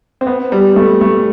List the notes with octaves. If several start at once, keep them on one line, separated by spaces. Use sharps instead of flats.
C4
B3
G3
A3
A3